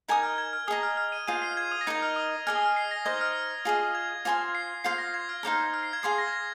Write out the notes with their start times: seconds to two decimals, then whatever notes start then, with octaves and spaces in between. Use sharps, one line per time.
0.08 D#4 A#4 G#5 D#6 G#6
0.23 F6
0.38 G#6
0.53 F6
0.67 G#4 D#5 A#5 D#6
0.83 F6
0.97 F6
1.12 D#7
1.27 F4 G#4 C5 D#5 D#7
1.42 C7
1.57 G#6
1.71 D#6
1.81 A#6
1.87 D#4 A#4 D#5 G#6
2.02 F6
2.16 D#6
2.47 G#4 D#5 G#5 F6
2.56 D#6
2.66 F6
2.76 C7
2.91 A#6
3.05 D#4 C5 D#5 G#6
3.21 F6
3.65 F4 G#4 D#5
3.95 G#6
4.25 F4 C5 G#5 C6
4.55 C7
4.84 F4 C5 F5 C6 C7
4.98 A#6
5.14 G#6
5.29 F6
5.43 D#4 C5 F5 A#5
5.74 F6
5.83 C7
5.93 G#6
6.02 G#4 F5 C6 D#6 C7
6.18 A#6
6.28 G#6
6.33 A#6